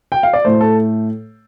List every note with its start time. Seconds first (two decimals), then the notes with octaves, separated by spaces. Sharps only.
0.12 G5
0.23 F5
0.33 D5
0.45 A2 A3 C5
0.61 A4